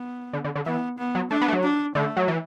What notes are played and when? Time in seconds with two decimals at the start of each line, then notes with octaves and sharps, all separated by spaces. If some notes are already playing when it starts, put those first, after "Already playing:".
Already playing: B3
0.33 D3
0.44 D3
0.55 D3
0.66 E3 B3
0.98 B3
1.15 F#3
1.30 A3 D4
1.41 B3
1.48 A3
1.53 F#3
1.63 D4
1.95 D3 A3
2.17 F#3
2.28 E3